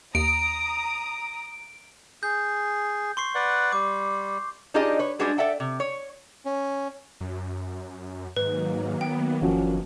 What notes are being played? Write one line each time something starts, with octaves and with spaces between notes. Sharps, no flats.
D#2 A#5 D#6 D7
G#4 G6
C6 C#6 C7
B4 D5 F#5
G3 D6
D4 D#4 F4 G4 G#4 D#5
B4 C#5
G3 G#3 D4 F#4 G#4 B4
A4 D5 E5 F#5 G5
C3
C#5
C#4
F#2
G#2 D#3 F#3 A#3 B4
B3 G5
G1 F3 C#4 F#4